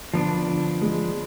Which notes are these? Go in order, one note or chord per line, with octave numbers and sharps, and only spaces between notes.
D3 F3 B3 D4
D3
G#3